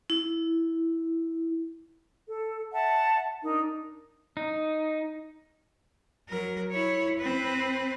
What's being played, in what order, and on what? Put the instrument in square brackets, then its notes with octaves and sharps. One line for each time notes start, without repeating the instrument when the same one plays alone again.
[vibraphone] E4
[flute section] A4
E5 F#5 A5
D4 D#4 A#4
[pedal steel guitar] D#4
[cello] F#3 A#4
E4 C#5
C4 B4